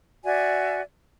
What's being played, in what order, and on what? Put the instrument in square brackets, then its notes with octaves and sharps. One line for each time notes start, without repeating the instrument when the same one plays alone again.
[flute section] F#4 D5 E5 G#5